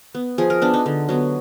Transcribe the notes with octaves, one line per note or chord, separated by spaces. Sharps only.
B3
F3 G#4
A#4
B3 D4
D#4
D3
F#3 B3